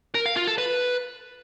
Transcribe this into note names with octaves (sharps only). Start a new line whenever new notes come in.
A#4
F5
F4
A4
B4